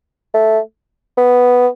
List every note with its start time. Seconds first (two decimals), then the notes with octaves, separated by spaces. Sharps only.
0.34 A3
1.18 B3